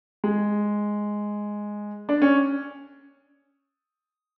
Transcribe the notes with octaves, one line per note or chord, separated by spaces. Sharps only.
G#3
D4
C#4